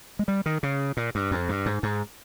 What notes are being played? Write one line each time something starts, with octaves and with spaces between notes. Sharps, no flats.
G#3
G3
D#3
C#3
A#2
G2
F2
G2
G#2
G#2